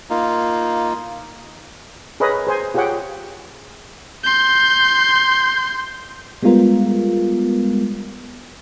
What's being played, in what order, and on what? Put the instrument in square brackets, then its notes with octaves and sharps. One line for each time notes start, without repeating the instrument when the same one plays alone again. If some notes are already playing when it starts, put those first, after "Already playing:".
[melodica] A#3 D#4 F4
[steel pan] G#4 A#4 B4 C#5 D#5
G#4 C5 G#5
F4 G4 G#4 C#5 F#5 G5
[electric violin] C6 G6
[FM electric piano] G3 G#3 B3 F4 A#4